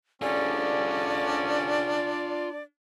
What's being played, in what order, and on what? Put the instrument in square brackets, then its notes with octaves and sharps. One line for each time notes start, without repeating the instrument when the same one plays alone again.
[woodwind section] C2 D3 C#4 [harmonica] D4 [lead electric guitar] F4 G#4 [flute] D5